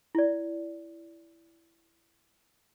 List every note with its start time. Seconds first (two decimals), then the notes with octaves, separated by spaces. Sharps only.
0.15 E4 D5